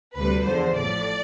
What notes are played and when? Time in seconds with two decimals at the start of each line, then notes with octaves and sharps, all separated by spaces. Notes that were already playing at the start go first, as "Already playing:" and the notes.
0.16 D2 C3 G3 B4
0.46 E2 D3 F3 C5
0.76 A1 A2 F3 D5